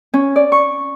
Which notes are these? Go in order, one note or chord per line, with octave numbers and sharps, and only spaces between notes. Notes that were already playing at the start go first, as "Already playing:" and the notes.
C#4
D5
C#6